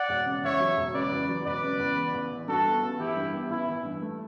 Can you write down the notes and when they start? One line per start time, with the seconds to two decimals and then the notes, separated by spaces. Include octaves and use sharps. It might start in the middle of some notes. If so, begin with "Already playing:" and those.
Already playing: D5 F#5
0.09 E1
0.26 C#3
0.43 E2 C#5 E5
0.60 F#3
0.77 E1
0.94 C#3 B4 D5
1.11 E2
1.29 F#3
1.45 E1 B4 D5
1.63 C#3
1.79 E2
1.96 B3
2.14 A1
2.31 E3
2.48 G2 F#4 A4
2.66 B3
2.82 A1
2.99 E3 E4 G4
3.16 G2
3.33 B3
3.50 A1 E4
3.67 E3
3.85 G2
4.02 A3